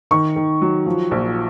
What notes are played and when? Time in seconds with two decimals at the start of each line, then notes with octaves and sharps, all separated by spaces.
0.11 D#3 C#6
0.36 D#3
0.61 F#3
0.86 F3
1.11 A#1